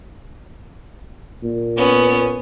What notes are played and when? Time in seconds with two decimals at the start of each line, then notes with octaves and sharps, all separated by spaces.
1.44 A#2
1.77 B3 C#4